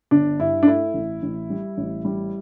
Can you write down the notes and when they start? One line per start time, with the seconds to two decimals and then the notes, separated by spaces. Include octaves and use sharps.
0.11 G1 D4
0.40 G2 E4
0.63 D4
0.66 A3 E4
0.94 A1
1.23 A1
1.50 G3
1.78 A1
2.05 G3